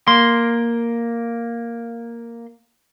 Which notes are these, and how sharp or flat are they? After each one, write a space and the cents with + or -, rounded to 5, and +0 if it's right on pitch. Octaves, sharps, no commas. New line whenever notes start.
A#3 +0 C6 +0